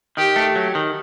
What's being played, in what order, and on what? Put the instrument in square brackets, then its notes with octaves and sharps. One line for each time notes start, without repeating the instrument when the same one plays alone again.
[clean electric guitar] D#3 [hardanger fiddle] G4
[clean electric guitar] A3
F#3
D#3